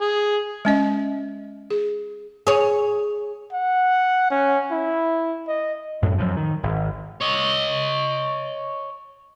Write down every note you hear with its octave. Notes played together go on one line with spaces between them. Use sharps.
G#4
G#3 C#4 D#5
G#4
G#4 C#5
F#5
C#4
E4
D#5
F#2 A2 A3
F#2 F3
D#3
G#1
C#5 D#5